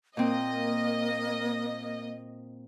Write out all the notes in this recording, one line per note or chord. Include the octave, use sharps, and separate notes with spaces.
A#2 A#3 C4 D#5